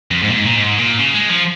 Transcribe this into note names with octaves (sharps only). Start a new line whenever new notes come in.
F2
G#2
A#2
G#2
A#2
G#2
A#2
C#3
G#3
F3